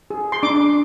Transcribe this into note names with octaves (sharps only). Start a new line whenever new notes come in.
G#4
C6
D4 D6